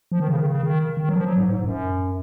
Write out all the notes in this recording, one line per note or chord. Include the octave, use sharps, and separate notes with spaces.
F3
D#3
C#3
D#3
C#3
D#3
D#3
F#3
F3
F#3
G#2
G#2
G#2
F#2